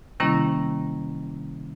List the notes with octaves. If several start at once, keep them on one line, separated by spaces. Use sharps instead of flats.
C3 D#3 G3 A#3 C#4 E4